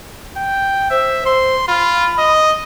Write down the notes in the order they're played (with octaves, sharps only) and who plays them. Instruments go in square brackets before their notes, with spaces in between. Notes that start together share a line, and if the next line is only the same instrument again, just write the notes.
[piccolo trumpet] G5
[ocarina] C5 [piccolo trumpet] E5
[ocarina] C5 [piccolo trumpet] C6
[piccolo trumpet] F4 [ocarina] B5
[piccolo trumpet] D#5